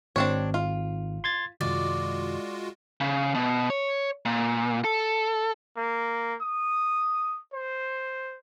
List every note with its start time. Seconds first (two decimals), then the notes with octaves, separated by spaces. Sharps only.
0.16 G#1 C4 D4 C#5
0.54 F4
1.24 C6 G#6 A6
1.61 F#2 C3 D#3 G#3 F4 F#4 D5
3.00 C#3
3.35 B2
3.70 C#5
4.25 A#2
4.84 A4
5.77 A#3
6.41 D#6
7.53 C5